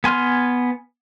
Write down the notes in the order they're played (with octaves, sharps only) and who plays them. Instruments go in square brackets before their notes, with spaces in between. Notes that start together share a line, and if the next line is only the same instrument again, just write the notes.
[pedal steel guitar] B3 G#5 C6 F6